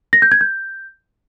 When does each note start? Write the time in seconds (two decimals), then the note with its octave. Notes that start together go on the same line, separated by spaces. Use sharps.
0.13 A#6
0.22 G6
0.32 G#6
0.41 G6